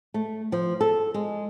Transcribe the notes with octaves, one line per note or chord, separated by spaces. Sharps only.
A3
F3
A4
G#3